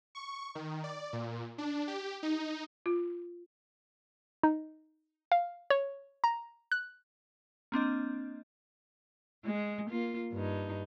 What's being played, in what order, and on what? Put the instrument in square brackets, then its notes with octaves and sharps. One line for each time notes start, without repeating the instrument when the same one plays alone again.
[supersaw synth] C#6
D#3
D5
A#2
D4
G4
D#4
[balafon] F4
[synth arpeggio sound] D#4
F5
C#5
A#5
F#6
[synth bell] A#3 C4 D4 D#5
[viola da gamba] G#3
A#3 F4
G2 D#4